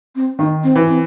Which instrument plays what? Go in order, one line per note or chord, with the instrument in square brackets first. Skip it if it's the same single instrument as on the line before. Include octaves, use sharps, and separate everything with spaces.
[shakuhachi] C4
[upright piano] D#3 [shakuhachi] D#4
[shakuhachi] C4
[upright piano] E3
[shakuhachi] C4